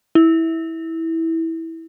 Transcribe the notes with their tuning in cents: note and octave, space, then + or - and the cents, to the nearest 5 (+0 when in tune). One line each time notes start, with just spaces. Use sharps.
E4 -15